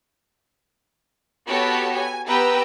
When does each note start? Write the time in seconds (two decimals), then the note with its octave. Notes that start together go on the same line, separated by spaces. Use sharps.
1.47 B3 F#4 G4 A4 C#5 A5
1.96 G#5
2.28 B3 G4 B4 G5 A#5 E6